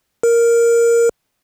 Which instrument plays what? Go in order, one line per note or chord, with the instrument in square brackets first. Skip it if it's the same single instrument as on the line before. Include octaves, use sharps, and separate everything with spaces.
[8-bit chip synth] A#4